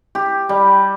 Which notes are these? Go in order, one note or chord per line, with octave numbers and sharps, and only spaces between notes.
G4
G3